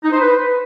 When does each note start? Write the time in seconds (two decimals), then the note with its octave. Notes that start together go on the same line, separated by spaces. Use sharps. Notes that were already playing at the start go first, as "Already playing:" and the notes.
0.03 D#4
0.12 C5
0.20 B4